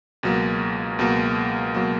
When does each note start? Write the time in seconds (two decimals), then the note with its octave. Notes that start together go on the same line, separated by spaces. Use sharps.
0.23 C#2 B2 F#3 A#3
0.99 C#2 B2 F#3 A#3
1.75 B2 F#3 A#3